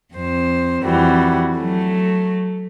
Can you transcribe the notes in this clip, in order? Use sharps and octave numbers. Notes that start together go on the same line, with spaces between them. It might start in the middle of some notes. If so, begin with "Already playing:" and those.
F2 C5
F2 E3 G3 F#4
F#3 A3